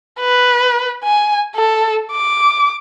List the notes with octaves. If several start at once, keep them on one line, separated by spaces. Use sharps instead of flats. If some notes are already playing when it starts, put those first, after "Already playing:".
B4
G#5
A4
D6